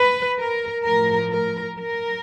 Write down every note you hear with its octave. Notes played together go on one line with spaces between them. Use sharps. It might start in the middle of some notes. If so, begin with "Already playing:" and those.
Already playing: B4
A#4
A2 F3 A#4
A#4
A#4